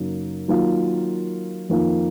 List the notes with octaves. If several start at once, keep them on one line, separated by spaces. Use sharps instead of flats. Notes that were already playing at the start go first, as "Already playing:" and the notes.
Already playing: F#2 C#3 F#3 A#3 D#4
D#3 F#3 A#3 F4
F2 D#3 A#3 F4